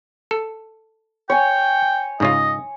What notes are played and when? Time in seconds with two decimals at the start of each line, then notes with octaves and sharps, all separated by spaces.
0.31 A4
1.30 C#5 G5 G#5
2.20 G#2 C#3 F4 D#5